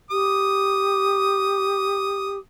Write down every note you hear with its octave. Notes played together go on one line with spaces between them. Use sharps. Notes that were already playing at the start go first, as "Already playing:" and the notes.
G4 D#6